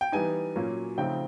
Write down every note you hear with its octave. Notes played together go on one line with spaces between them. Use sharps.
G5
E3 G3 B3 D#4 G#5
A#2 F#3 A#3 C#4
C#3 F3 A3 C4 D#4 G5